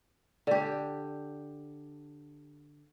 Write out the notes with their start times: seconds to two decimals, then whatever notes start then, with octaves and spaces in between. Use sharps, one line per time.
0.47 D3 G4